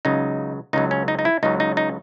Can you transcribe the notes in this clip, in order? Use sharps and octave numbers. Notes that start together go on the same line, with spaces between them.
C#2 C#3 F#3 D#4
C#2 C#3 F#3 D#4
C#4
D#4
D#4
E4
C#2 C#3 F#3 D#4
D#4
D#4